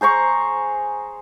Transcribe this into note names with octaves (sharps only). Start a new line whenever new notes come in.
G#4 C5 A#5 C#6